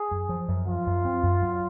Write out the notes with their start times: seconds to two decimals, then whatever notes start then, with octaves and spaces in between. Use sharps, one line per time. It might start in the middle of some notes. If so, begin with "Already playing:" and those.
Already playing: G#4
0.11 F#2
0.29 F3
0.48 F#2
0.67 F3 F4
0.86 F#2
1.05 C4
1.23 F#2
1.42 F#3